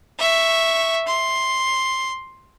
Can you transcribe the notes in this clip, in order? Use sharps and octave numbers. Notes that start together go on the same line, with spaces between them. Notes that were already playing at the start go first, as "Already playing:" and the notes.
E5 C#6
C6